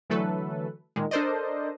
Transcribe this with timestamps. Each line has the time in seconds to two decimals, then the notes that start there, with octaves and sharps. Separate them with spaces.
0.10 D3 E3 F#3 A3 A4 B4
0.96 A#2 D#3 G#3
1.11 D4 A4 A#4 C5 D5 D#5